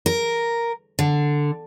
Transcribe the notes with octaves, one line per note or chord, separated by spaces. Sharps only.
A#4
D3